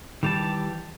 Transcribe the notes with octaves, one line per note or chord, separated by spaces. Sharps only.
D#3 E3 G3 G4 A5